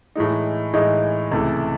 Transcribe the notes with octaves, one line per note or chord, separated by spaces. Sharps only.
A2 E3 G#3 D#4
A2 E3 G#3 D#4
C#2 C3 E3 A3